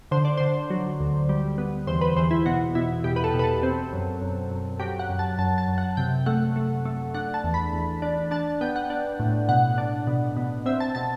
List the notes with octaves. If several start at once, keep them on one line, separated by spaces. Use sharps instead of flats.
D3 C5
D5
D3 C5
F#3
D2
G3
B3
E2 C5
B4
E2 C5
E4
B2 F#4
B2 E4
B2 G4
B4
A4
B2
B4
A4
C4
F#2
F#2
F#2
F#3 G4
F#5
F#2
A5
F#2 A5
A5
F#2
F#5
C3 G5
A3 F#5
A3
A3
D4 F#5
A5
E2
B5
E2
D4
D4 A5
B3 G5
F#5
D4
A2
B2 F#5
D4
B2
B2
C4 E5
A5
B2 A5